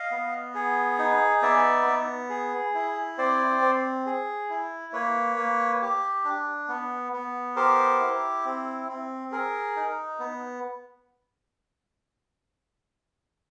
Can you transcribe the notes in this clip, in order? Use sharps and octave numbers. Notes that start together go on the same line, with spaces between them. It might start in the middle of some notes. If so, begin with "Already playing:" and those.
Already playing: D#5 F5
B3
G#4
D#4
B3 D5 E5
B3
G#4
E4
C4 C5 D5
C4
G#4
E4
A#3 B4 C#5
A#3
G4
D4
B3
B3
G4 A#4 C5
E4
C4
C4
G#4 A#4
D#4
B3